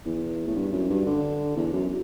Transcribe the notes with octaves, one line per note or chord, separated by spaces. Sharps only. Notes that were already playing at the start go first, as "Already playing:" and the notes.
E2
A2
G2
F#2
G2
D3
E2
F#2